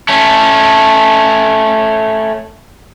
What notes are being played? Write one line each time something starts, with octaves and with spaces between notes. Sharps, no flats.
A3 C#4